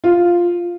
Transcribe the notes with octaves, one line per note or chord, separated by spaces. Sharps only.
F4